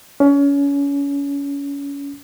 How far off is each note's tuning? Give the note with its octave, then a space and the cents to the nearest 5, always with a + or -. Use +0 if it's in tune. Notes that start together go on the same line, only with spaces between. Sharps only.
C#4 +30